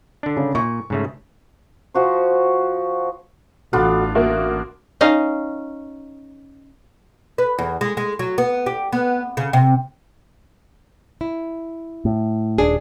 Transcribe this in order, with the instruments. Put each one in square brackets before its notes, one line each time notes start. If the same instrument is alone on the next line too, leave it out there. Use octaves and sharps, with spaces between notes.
[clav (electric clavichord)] D3 D4
[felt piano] C#3
[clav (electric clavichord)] A#2 [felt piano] C#6
[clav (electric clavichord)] G#2 C#3 A3
[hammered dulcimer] F3 F#4 C5
[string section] A1 [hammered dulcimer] B3 D4 F4 [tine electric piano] F#4 A4 F#5
[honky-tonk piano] A#3 F#4 [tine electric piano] E5
[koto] C#4 D#4 F5
[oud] B4
E2
G#3
G#3
F#3
B3
G4
B3
C#3
C3
[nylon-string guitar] E4
[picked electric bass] A2
[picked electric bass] D#1 [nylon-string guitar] G#3 D4 G#4